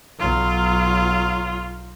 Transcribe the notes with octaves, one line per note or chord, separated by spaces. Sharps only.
B1 F#3 F4